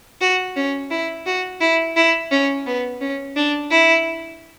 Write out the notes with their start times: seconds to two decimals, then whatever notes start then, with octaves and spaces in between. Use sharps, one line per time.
0.21 F#4
0.56 C#4
0.91 E4
1.26 F#4
1.60 E4
1.96 E4
2.31 C#4
2.66 B3
3.01 C#4
3.36 D4
3.71 E4